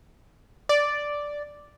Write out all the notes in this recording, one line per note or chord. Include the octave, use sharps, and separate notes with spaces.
D5